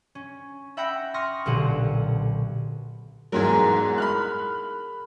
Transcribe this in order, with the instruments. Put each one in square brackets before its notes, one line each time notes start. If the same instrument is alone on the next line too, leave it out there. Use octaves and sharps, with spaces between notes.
[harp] C#4
E5 F#5 G5 B5 G6 A#6
C6 C#6 D#6 F6 A#6
B1 A#2 D3 G4 F#5 D#7
[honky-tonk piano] E2 G#2 F#3 [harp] G#4 A#4
[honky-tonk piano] B5 F6 F#6